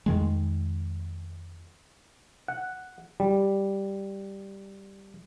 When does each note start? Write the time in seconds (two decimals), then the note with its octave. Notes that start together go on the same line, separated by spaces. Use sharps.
0.06 F2 D#3 G#3
2.48 F#5
3.20 G3